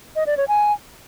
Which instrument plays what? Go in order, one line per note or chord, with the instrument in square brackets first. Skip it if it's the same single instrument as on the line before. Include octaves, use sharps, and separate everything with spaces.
[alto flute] D#5
D5
C#5
G#5